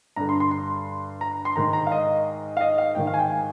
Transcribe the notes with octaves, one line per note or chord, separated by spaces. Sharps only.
G2 D3 A#5
C6
C6
C6
A#5
C6
G#2 D#3 A#5
A#5
F5
D#5
F5
D#5
F5
G#2 D#3 G5
F5
G#5
G5
G#5